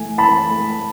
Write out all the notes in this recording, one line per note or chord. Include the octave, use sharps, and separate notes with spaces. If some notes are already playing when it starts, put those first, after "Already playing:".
Already playing: E3 A3 G#5
E3 A5 B5
A3